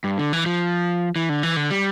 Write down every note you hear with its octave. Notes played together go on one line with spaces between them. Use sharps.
G2
D3
E3
F3
E3
D3
E3
D3
G3